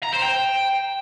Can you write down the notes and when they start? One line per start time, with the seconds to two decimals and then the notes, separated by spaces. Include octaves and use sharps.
0.03 A#5
0.13 C5
0.22 G5